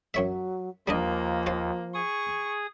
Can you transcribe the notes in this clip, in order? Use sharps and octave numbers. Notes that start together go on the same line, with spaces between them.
F#2 F#3 C#5 E5
D#2 F3 G3 A#3 D4 D#5
F4 C5
G#4 C#6 D#6